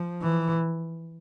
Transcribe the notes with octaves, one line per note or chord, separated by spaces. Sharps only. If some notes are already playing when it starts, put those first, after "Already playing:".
Already playing: F3
E3